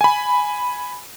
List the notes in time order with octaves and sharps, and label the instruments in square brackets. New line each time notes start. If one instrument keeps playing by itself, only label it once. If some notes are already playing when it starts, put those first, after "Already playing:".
[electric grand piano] G#5 B5